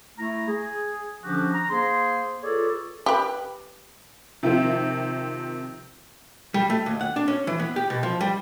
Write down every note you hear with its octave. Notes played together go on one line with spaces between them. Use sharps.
A3 E4 A#5
G#4
D3 F3 C#4 D4 F#4 G4
A#5
A#3 G#4 C5 C6
F4 G#4 A4 B4 C#5 D5
G4 B4
C3 D#3 F3 C4
G3
A3
D#2
F#5
D4
C#4
E3
B3
G4
B2
F3
G3